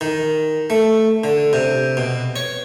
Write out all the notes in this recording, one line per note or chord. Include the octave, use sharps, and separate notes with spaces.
D#3
A3
D3
C3
B2
C#5